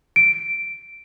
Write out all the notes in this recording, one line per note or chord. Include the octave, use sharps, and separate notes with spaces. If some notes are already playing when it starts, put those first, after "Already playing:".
D7